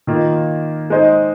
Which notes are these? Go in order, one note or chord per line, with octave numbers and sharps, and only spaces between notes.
D#3 A#3 F4
G#3 D#4 C5 D#5